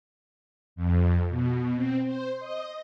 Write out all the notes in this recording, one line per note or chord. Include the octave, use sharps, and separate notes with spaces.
F2
B2
C4
C5
D#5